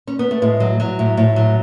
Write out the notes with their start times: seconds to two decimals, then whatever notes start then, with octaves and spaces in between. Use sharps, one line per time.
0.07 C#4
0.19 B3
0.31 A3
0.42 A2 G#3
0.60 F#3
0.80 F#3
0.99 A2
1.17 A2
1.36 F#3